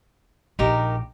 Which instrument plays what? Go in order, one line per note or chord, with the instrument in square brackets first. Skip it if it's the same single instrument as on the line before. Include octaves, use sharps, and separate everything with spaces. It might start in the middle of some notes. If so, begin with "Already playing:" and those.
[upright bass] A#1 [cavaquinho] D#4 G4 A#4